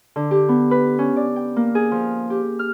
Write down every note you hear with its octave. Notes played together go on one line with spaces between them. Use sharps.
D3
G4
B3
B4
C#4
D5
G5
A#3
G#4
F3
G4
F6